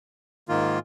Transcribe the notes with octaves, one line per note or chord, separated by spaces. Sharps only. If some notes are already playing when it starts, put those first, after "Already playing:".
G#2 D#3 A#3 F4